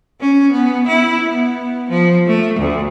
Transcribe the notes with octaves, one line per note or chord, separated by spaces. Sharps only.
C#4
B3
E4
B3
F3
A3
D2